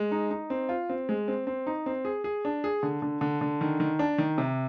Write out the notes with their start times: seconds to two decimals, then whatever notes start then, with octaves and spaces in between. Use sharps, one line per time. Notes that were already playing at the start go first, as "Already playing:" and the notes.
Already playing: G#3
0.12 D#4
0.31 D#4
0.50 C4
0.69 F4
0.89 C4
1.09 G#3
1.28 C4
1.47 C4
1.67 D#4
1.86 C4
2.05 G#4
2.24 G#4
2.45 D4
2.64 G#4
2.83 D3
3.02 D3
3.21 D3
3.41 D3
3.61 D#3
3.80 D#3
3.99 D4
4.18 D#3
4.38 C3